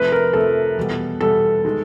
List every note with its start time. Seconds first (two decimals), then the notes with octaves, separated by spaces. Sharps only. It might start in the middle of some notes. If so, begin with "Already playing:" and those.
Already playing: F2 C3 F3 A3 B4
0.12 A#4
0.33 F2 C3 F3 A3 A4
0.77 E2 B2 G3 B3
1.21 E2 B2 G3 B3 A4
1.65 D#3 G#3